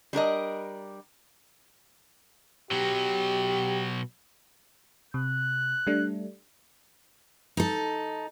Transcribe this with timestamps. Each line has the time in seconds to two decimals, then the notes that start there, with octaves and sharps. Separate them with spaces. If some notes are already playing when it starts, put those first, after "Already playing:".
0.13 G3 D4 A#4 D#5
2.71 B2 F#3 G4
5.14 C3 F#6
5.87 G3 A3 D4
7.57 D#4 A4